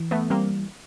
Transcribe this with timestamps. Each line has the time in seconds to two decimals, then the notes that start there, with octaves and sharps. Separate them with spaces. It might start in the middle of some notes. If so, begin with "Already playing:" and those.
Already playing: E3
0.11 A3 B3
0.30 G3 A#3 C4